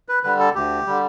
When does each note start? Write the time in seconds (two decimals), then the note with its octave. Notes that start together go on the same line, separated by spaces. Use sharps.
0.09 B4
0.23 D3 G3 B4
0.39 A4
0.55 D2 G4
0.86 D3 G3